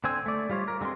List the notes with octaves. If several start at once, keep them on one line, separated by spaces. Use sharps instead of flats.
D3 C4 C5 G#5 E6
A3 D5
G3 F4 C5 C#5
A#4
D3 G#3 B3 C4 C6